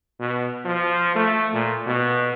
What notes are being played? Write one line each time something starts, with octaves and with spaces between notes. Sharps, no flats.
B2
F3
A3
A#2
B2